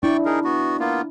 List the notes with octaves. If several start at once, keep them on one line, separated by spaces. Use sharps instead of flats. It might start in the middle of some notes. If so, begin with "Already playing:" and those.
D4 E4 D5 G5 C#6
D#4 G#4 A#4
B3 F#4
A#3 B3 F4